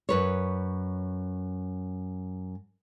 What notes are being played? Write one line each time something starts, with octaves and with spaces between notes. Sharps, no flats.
F#2 B4 C#5